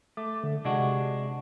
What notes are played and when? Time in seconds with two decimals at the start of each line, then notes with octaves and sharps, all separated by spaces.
0.17 A3 D6
0.44 D3
0.65 C3 G#3 D4 F#4